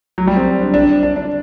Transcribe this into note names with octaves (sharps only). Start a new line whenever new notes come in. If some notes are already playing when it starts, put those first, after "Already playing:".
F#3
G3
C4
D4
D4
D4
D4